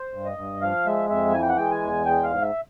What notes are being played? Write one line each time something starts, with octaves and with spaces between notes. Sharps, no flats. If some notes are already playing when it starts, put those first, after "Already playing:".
Already playing: C5
G2
D#5
G2
F3 F5
G#3 E5
F2 E5
E3 G#5
G5
F#5
G#3 G5
G#5
E2
G#3 G5
F5
G#2
E5